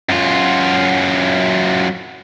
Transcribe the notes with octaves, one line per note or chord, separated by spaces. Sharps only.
F#2 F4